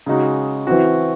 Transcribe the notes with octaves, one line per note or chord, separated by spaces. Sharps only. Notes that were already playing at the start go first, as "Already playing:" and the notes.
C#3 G#3 D#4 F#4
E3 C4 F#4